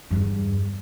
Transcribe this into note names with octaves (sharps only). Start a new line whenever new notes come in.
E2 G2